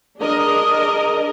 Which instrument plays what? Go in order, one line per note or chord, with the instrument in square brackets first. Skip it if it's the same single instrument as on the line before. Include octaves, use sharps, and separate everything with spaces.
[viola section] D4 G#4 A#4 D#5